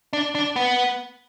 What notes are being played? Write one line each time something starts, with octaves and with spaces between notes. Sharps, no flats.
D4
D4
B3